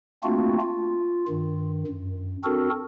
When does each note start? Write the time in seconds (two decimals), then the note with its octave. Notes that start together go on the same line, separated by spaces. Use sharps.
0.24 A3 A#3 C4 D4 F4 F#4
0.61 F4
1.28 G2 D#3
1.87 F#2
2.44 C4 D4 F#4 A4 A#4